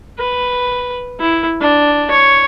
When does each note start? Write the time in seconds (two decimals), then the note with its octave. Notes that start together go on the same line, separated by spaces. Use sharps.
0.19 B4
1.20 E4
1.61 D4
2.11 C#5